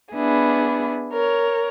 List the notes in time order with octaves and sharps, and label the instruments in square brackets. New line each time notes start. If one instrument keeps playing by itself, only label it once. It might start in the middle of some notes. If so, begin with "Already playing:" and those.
[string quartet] B3 D4 E4 G#4
A#4 C#5